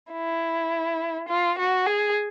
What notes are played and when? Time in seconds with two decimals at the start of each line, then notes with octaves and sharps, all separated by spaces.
0.12 E4
1.28 F4
1.58 F#4
1.86 G#4